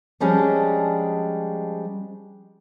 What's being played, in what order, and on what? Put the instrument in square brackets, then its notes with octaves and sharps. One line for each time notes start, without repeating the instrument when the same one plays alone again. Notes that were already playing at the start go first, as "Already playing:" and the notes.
[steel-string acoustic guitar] F3 G3 G#3 C#4 D4